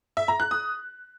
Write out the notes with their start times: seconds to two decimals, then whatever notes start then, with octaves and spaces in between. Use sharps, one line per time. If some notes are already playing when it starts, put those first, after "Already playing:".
0.17 E5
0.28 A#5
0.40 F#6
0.51 D#6